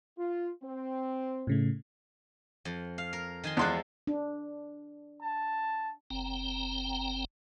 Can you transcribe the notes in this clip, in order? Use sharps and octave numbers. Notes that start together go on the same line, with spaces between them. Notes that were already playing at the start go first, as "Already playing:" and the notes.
F4
C4
A2 C#3 A3
F2
F5
A#4
D#3 G#5 C6
E2 F3 G#3 A4 C6 F#6
D4
A5
F#1 C4 G5 A#5